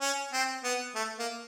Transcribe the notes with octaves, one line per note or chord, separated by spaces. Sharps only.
C#4
C4
B3
A3
A#3